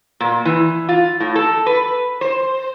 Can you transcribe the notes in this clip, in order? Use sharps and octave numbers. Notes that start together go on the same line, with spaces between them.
A#2
E3
F4
A2
A4
B4
C5